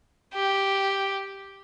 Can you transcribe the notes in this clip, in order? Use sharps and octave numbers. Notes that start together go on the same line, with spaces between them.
G4